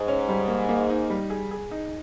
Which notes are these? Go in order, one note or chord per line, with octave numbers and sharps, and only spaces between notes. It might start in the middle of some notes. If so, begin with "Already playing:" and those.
Already playing: G#2
C#4
G3
A#3
A#3
D#4
G3
G#4
G#4
D#4